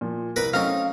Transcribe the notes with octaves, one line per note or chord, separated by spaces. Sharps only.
A#2 F3
C2 A#4 B4 B5
F#3 A3 C4 C#4 D#4 F5